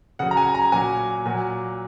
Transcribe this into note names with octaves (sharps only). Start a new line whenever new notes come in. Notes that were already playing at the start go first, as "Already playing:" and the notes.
C#3 F#3 F#5
A#5
G#5
A#5
A#2 F#3 G#5
A#2 F#3